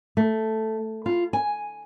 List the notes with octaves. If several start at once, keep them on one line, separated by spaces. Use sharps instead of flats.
A3
F4
G#5